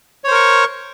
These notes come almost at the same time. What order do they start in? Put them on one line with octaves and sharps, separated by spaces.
C#5 C5 A#4 C#6